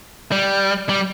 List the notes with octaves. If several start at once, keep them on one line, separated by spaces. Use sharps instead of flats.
G3
G3